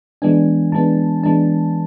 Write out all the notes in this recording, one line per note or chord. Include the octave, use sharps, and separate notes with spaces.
E3 G#3 B3 D4 G#5
E3 G#3 B3 D4 A5
E3 G#3 B3 D4 A5